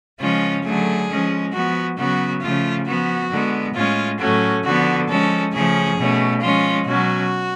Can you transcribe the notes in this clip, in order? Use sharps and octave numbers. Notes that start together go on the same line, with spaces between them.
C#3 F3 G#3 C#4 F4
D3 F#3 A3 G#4
F3 G#3 C#4
F3 B3 F#4
C#3 F#3 B3 F#4
C#3 F3 A3 F4
F3 B3 F#4
D3 G#3 B3
A2 G#3 C#4 F4
A2 F#3 A3 C#4 F#4
D3 F3 B3 F#4
F3 G#3 C#4 A4
C#3 F3 A3 C#4 G#4
B2 A3 C#4
F3 G#3 C#4 F4
B2 F#3 C#4 F#4